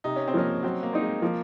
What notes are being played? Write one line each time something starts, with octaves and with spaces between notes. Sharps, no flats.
C3 D#4
C#4
C4
F3 A#3 C#4
F#3 C4
A#3
C4 D#4
G#3
F3 A#3